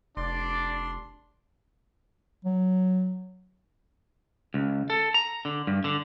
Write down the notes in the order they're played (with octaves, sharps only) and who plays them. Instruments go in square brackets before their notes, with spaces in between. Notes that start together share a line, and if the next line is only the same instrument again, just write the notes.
[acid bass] F1 [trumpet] D4 [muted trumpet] D5 [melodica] C6
[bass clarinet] F#3
[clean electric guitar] C#2
A4
A#5
D3
G2
D3